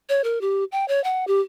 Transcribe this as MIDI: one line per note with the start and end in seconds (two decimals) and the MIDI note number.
0.09 0.22 73
0.24 0.41 70
0.41 0.64 67
0.72 0.87 79
0.88 1.02 73
1.04 1.25 78
1.27 1.41 67